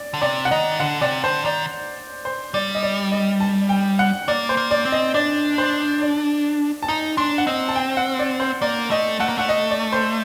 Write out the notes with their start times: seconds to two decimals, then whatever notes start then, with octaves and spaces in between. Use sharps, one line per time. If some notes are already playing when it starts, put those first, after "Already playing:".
Already playing: D5
0.14 D3
0.22 C3 D5
0.45 F#5
0.51 D#3 D#5
0.80 D3 F#5
1.01 C3 D5
1.24 D3 C5
1.45 D#3 D5
2.25 C5
2.54 G3 D5
2.75 D#5
2.83 D5
3.12 D#5
3.40 A5
3.69 G5
3.99 F#5
4.28 A#3 D5
4.49 C5
4.57 A#3
4.71 D5
4.85 C4
4.92 D#5
5.14 D4 D5
5.58 C5
6.02 D5
6.83 A5
6.88 D#4 A#5
7.17 D4 C6
7.38 F#5
7.46 C4 D#5
7.68 A5
7.75 G5
7.97 F#5
8.19 D5
8.40 C5
8.62 A#3 D5
8.90 A3 D#5
9.20 A3 F#5
9.29 A#3
9.38 A3 F#5
9.49 D#5
9.71 D5
9.92 C5